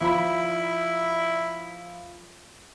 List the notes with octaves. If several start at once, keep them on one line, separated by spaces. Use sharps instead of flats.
F3 E4 B5